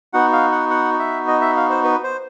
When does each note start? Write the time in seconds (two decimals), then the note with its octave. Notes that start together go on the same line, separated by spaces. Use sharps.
0.13 B3 D#4 F#4 F#5
0.33 F5
0.52 F#5
0.70 F#5
0.99 E5
1.28 D#5
1.41 E5
1.57 F5
1.70 C5
1.84 B4
2.04 C5